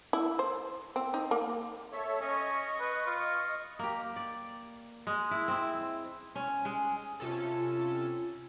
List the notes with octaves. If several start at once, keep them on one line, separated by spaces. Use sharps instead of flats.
E4
C5
C4
D#4
A#3
A4 C#5 E5
C#4 D#5 C#6
B4
F4
A#3 G4
D5
G#3
E4
C4 E4
C#4
G#3
C3 C#4 F4 A4